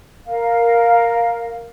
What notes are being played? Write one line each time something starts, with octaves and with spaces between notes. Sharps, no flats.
A#4 F5